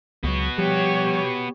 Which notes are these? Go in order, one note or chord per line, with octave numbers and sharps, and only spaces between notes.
C#2 F#3 B3 F#4
F3 G3 G4 C#5